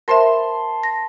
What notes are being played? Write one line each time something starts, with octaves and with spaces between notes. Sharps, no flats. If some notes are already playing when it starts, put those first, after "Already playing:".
A#4 C5 E5 A5 C6
A#6